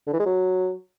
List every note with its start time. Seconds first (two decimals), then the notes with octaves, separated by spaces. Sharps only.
0.07 D3
0.13 E3
0.19 G#3
0.26 F#3